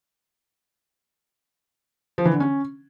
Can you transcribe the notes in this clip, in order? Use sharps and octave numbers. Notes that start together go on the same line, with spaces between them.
F3
E3
D3
C#4